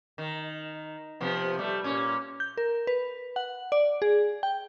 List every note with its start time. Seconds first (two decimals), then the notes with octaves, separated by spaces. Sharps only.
0.18 D#3
1.20 C3 F3 B3
1.59 G3 A3
1.84 A#2 C#4
2.40 G6
2.57 A#4
2.87 B4
3.36 F#5
3.72 D5
4.02 G#4
4.43 G5